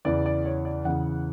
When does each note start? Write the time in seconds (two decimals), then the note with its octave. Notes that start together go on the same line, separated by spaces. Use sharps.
0.05 E2 C#3 E3 D5
0.26 D5
0.45 C#5
0.65 D5
0.85 E2 C#3 E3 F#5